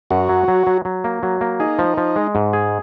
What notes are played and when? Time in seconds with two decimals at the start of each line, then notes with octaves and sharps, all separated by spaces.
0.11 F#2 F#4
0.29 F#3
0.48 F#3
0.67 F#3
0.85 F#3
1.04 A#3
1.23 F#3
1.41 A#3
1.60 D#4 G#4
1.79 F3
1.97 F3
2.16 G#3
2.35 G#2
2.53 G#4